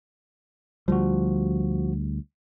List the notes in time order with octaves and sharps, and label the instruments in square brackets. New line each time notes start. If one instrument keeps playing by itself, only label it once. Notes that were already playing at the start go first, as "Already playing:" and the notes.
[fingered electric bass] D2 G3 [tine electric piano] F3 F#4